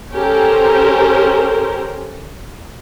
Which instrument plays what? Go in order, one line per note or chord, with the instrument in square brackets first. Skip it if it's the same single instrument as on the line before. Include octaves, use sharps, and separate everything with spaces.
[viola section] C#4 G4 A4 A#4 C5